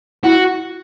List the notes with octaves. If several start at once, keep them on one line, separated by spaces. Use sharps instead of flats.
E4 F#4